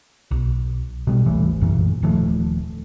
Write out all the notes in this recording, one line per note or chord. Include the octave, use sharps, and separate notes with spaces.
B1
B2 G3
D1 G#1 E3 A3
B1 F#2 A#2 E3
D#1 D#3 F3 A3